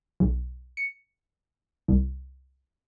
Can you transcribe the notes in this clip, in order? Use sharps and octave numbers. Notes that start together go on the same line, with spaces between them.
B1
C#7
C2